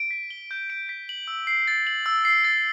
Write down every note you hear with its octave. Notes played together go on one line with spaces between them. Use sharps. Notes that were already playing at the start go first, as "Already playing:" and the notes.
Already playing: D7
B6
G7
G6
D7
B6
F#7
E6
C7
A6
F#7
E6
C7
A6